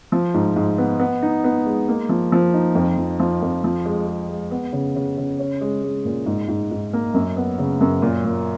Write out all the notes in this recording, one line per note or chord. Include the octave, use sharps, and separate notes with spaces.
F3
G#2
G#2
B3
B3
D#4
B3
G#3
A#3
F3
F3
D#4
F2
F3
F3
F2
F3
G#3
G#3
G#3
B3
C#3
C#3
C#3
C#4
G#3
G#3
A#2
G#2
G#2
G#2
A#3
F#2
B3
C#3
F#2
A#2
A#2